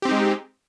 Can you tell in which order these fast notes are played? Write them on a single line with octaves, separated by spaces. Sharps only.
G4 C4 D#4 G#3